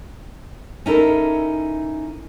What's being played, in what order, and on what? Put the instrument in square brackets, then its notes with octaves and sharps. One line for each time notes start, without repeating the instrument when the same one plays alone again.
[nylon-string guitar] C#4 D#4 E4 A4 A#4